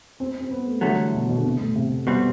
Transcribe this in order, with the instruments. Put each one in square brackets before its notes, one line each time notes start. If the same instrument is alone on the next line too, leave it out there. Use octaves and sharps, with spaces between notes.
[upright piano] C4
C4
B3
A3
[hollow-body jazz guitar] E2 D3 F#3 A3 [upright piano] G3
[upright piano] B2
B2
D3
C3
A2
C3
[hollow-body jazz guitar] C2 B2 G3 C4